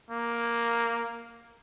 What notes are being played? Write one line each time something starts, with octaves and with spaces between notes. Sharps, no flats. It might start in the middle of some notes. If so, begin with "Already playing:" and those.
A#3